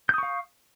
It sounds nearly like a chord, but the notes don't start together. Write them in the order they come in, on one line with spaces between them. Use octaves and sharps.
G6 D#6 C#6 F5